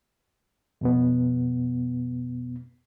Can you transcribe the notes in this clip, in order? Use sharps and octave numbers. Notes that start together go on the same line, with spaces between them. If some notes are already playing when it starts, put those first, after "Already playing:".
F2 B2 B3